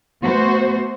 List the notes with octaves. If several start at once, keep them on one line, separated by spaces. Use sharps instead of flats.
A3 B3 F#4 C5